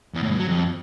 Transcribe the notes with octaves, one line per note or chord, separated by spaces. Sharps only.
E2
A2
G2
F#3
F2